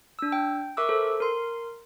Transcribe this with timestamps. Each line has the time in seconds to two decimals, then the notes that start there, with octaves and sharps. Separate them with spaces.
0.19 D4 E6
0.32 G5
0.77 A#4 E5 C#6 D6 E6 F#6
0.89 A4 C5
1.20 A#4 C6 C7